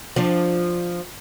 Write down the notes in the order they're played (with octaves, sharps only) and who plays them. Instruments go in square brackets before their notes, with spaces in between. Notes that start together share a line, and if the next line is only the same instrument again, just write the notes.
[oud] F3 D4